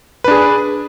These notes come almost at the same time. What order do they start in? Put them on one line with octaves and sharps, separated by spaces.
B4 D4 G#4